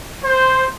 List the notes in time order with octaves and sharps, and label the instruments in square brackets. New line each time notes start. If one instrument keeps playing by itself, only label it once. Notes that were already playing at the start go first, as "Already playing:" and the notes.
[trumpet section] C5